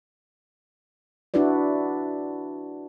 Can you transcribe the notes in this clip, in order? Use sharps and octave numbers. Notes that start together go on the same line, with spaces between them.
D4 E4 F#4 B4 D5